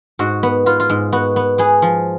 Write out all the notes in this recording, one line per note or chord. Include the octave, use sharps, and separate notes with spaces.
G#2 F#4
B3
B3 F4
F4
G#2
B3 F#4
B3
B3 G#4
F3